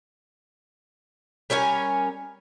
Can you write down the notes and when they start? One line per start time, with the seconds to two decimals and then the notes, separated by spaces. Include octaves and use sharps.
1.50 G3 C#4 A#4 G#5